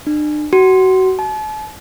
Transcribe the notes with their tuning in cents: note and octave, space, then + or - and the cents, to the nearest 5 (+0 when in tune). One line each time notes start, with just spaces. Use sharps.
D4 +40
F#4 +25
A5 -40